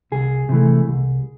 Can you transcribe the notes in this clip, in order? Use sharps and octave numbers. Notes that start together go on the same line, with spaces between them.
C2 G#4
C3 E3 A3
C2